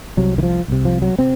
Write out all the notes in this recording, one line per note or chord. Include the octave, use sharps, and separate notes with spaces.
C2 C3 F#3
D#3
F3
C2 C3
F3
F#3
C3 C4